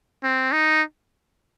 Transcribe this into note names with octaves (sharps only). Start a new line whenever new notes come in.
C4
D#4